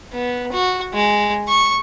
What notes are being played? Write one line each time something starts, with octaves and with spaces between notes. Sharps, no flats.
B3
F#4
G#3
C#6